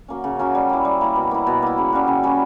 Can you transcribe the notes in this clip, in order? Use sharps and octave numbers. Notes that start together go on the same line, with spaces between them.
F#3 A#3 C#4
C#3
F#3 A#3 C#4
G3
A#3 E4
G3
A#3 E4
B2
A#3 E4
B2
A#3 E4
C#3
G3 C#4 F#4
C#3
G3 C#4 F#4